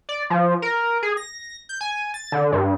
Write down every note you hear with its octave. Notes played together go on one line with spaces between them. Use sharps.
D5
F3
A#4
G#4
A#6
G6
G#5
A6
D3
G2